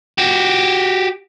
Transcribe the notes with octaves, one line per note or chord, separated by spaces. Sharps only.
F#4 G4